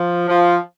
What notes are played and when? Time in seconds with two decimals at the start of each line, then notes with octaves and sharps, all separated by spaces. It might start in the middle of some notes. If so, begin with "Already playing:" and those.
Already playing: F3
0.29 F3